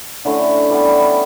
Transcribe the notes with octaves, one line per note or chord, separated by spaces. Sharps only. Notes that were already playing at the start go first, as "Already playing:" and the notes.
D3 A3 C#4 E4
E3 G3 B3